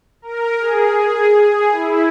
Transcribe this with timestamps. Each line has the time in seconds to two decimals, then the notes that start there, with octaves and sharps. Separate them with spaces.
0.22 A#4
0.59 G#4
0.97 G#4
1.34 G#4
1.72 E4